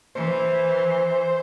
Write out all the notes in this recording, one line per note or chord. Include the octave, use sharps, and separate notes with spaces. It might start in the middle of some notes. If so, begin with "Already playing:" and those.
E3 C5